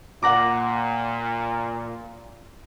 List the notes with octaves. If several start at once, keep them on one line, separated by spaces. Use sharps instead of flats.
A#2 F#5 A#5 D6